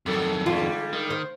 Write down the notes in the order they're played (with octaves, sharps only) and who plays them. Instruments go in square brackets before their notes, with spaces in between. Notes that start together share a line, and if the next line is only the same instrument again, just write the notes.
[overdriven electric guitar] F2 D#3 [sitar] F#3 A4
[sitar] D3 G3 G#3 [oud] F4
[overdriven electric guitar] D#3
[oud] C5